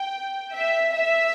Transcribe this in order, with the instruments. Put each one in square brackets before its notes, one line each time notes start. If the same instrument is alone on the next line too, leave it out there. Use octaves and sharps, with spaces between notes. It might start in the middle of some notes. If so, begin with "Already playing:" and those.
Already playing: [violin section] G5
E5
E5